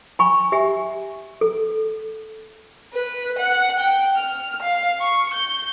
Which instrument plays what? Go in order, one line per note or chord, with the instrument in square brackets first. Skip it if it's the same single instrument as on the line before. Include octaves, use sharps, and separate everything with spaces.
[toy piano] G#5 B5 C#6
G4 E5 G#5
A4
[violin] B4
F#5
G5
F6
F5
C#6
G6